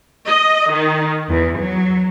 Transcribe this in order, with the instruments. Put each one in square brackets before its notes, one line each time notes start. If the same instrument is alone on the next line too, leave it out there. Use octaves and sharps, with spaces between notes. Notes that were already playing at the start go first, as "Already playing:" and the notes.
[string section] D#5
D#3
E2
F#3